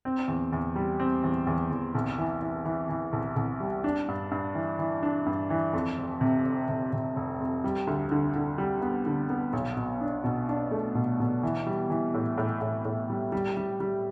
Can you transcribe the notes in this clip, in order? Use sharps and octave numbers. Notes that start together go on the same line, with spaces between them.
C4
E2
E2
G3
C4
E2
E2
E2
C2
E3
E3
E3
E3
C2
C2
G3
D4
G2
G2
E3
E3
D4
G2
E3
F2
F1
C3
F1
C3
C3
F1
F2
G3
D2
D3
D3
G3
B3
D3
B3
B1
B2
D4
B2
D4
A3
B2
B2
E3
G3
E3
A2
A2
A2
A2
G3
G3
G3
G3